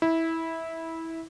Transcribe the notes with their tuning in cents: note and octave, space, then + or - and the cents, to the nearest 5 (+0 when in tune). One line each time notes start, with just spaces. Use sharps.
E4 -15